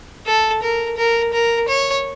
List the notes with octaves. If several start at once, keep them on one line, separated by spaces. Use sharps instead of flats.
A4
A#4
A#4
A#4
C#5